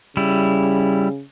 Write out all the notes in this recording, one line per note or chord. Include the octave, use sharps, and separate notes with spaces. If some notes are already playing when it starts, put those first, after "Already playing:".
C#3 G3 E4